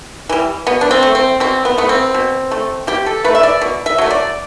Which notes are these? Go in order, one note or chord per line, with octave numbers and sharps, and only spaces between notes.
E3 G3
B2 B3
D4
C4
A3
C4
B2 C4
B3
A3 B3
C4
B2
A3
B2 G4
A4
A3 B4
E5
D5
B2
E5
F#3 A3
D5